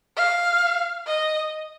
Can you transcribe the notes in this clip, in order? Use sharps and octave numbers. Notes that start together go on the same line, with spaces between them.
F5
D#5